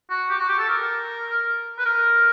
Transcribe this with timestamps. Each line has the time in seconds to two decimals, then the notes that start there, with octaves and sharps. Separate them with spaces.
0.10 F#4
0.30 G4
0.39 F#4
0.49 G4
0.59 A4
0.69 A#4
1.78 B4
1.85 A#4